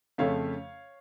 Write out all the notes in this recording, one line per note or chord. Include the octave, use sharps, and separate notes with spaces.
F2 C#3 A3 C#4 C#5 F5